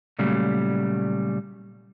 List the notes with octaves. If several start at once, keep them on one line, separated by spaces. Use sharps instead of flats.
A#2 C#3 F#3 G3 A3